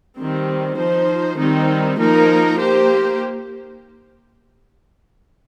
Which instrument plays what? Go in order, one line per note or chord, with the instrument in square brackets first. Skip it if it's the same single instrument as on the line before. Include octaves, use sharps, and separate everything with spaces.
[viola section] D#3 G3 C4
F3 D#4 C5
D#3 G3 C4 D#4
F3 A#3 D#4 A#4
A#3 G4 C5